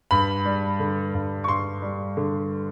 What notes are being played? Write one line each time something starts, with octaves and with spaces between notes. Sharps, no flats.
G2 B5
G3
D3
G2
C#6
G2 C6
G3
D3